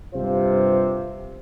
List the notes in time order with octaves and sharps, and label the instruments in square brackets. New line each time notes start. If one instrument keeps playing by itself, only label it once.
[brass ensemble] G2 C3 F4 C5